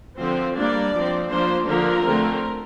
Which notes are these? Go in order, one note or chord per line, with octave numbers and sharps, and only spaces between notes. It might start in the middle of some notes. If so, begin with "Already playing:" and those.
D3 F3 C4 C5
G3 A#3 D4 D5
F3 C4
F3 A#3 D4 C5
D3 F3 A#3 D4 A#4
D3 A3 C4